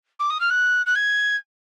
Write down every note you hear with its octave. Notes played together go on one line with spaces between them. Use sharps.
D6
D#6
F6
F#6
F#6
G#6